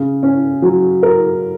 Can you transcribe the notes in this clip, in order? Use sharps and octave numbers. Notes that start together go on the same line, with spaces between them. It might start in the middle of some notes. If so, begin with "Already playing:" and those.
Already playing: C#3
C#4
F#3
A#4